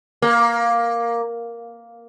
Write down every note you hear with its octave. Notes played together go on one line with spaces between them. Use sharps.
A#3